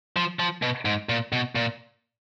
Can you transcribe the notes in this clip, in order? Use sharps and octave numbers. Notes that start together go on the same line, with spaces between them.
F3
F3
B2
G#2
A#2
B2
A#2